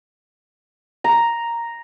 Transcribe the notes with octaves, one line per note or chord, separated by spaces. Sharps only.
A#5